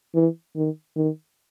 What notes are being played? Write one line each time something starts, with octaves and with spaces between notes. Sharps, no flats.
E3
D#3
D#3